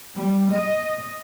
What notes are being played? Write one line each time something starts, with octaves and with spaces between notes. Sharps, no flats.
G3
D#5